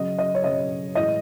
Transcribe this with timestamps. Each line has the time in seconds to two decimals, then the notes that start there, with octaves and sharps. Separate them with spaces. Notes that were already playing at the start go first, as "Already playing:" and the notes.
Already playing: C#3 F#3 D#5
0.19 D#5
0.35 C#5
0.44 C#3 F#3 D#5
0.95 A2 E3 G#3 D#5